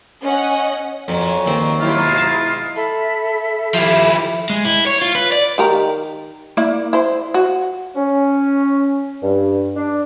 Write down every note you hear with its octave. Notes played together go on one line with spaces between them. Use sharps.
C#4 D#5 F#5
F2 A#2 F#3 C#4
D#2 C4
F#3 E4 F4 G4
G#2 B2 G#3
A5
A4 E5 A5 B5
F3 E4 G4 E5
G#3
E4
C#5
F4
B4
D5
D#3 G4 A#4
A#3 E4 D5
E4 C5
F#4
C#4
G2
D4